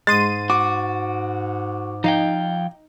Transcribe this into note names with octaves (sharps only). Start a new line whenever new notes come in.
G#2 G#3 C6 A6 D#7
F#4 D6
F3 D#4 F5 G5